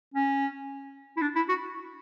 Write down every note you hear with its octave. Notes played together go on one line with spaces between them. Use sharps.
C#4
E4
D4
E4
F#4